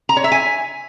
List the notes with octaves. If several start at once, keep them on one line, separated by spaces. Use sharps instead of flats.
A#5
C#5
E5
G#5